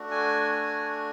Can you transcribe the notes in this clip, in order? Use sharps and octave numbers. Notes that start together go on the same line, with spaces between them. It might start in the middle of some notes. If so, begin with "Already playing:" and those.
Already playing: A3 D4 F#4
G#5
G#5